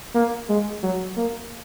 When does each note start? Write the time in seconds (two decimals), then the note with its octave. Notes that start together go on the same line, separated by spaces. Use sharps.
0.15 A#3
0.49 G#3
0.83 F#3
1.17 A#3